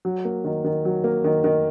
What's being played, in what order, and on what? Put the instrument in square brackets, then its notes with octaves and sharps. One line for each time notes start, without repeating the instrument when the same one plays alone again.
[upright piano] F#3
A#3
D#3
D#3
F#3
A#3
D#3
D#3